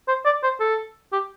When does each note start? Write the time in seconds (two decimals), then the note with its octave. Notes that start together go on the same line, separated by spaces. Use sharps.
0.08 C5
0.25 D5
0.43 C5
0.60 A4
1.12 G4